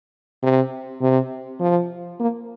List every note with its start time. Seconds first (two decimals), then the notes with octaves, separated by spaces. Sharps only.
0.43 C3
1.01 C3
1.60 F3
2.20 A#3